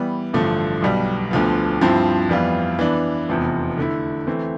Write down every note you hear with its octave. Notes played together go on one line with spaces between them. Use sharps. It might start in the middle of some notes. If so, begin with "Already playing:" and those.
Already playing: E3 G3 B3
A1 G2 D3 F3 A3
B1 B2 G3
D2 D3 F3 B3
G2 F3 C4 E4
F2 E3 G3 B3 F4
E3 B3 D4
F1 E2 C3 F3 B3
D3 A3 E4
E3 A3 C4